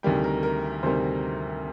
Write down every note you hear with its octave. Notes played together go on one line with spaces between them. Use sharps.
D2 C3 D#3 G3 G5
A#4
A#4
D2 C3 D#3 G3 C5